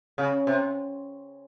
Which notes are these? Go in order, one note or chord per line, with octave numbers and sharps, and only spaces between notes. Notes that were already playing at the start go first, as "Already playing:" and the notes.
C#3
C3